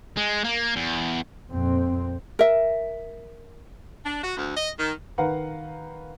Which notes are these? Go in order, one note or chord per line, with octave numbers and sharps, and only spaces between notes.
G#3
A#3
E2
F2 A#2 C4
A#4 E5
D4
F#4
D2
D#5
D#3
D#3 B4 F5 F#5 A#5